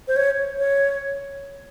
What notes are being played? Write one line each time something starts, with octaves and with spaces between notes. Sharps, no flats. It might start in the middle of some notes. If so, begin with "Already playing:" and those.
C5
C#5
C#5